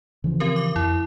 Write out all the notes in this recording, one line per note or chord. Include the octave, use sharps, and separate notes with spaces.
C#3 E3 F3
C4 G4 A#4
D6
F2 E4